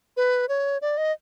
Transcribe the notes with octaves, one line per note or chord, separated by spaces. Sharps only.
B4
C#5
D5
D#5